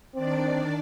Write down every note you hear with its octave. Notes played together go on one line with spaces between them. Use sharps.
D#3 C4 D4 D5